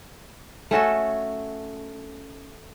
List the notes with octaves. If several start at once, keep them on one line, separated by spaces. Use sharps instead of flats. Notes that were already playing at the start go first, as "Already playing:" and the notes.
A3 C#4 F#4 A4